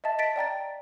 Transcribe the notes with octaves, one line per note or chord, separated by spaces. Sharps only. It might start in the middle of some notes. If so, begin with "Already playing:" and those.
D#5 E5 A5 A6
A6 B6 D7
D5 G5 A#5 A6